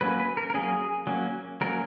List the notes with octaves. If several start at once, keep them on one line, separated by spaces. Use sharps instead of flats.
F#3 A#3 C#4 B4
B4
A#4
A#4
F#3 A#3 C#4 G#4
F#3 A#3 C#4
F#3 A#3 C#4 A#4